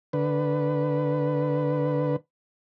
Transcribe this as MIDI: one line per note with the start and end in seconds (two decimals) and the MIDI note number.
0.13 2.16 50
0.13 2.16 71